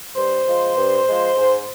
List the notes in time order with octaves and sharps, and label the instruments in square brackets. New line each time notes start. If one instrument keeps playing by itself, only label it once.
[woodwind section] G2 C5
F3 G#3
G2
F3 G#3
G#2